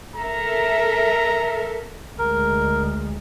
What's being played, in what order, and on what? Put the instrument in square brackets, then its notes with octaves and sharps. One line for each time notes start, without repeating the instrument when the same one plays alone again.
[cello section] A4 A#4 E5 [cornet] A#5
[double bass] D2 G#3 [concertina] A#4